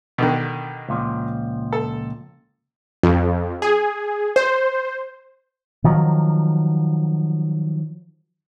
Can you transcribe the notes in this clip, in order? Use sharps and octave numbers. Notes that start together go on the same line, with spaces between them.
B2 D3 D#3
C#2 A#2 F3
A4
F2
G#4
C5
D#3 F3 F#3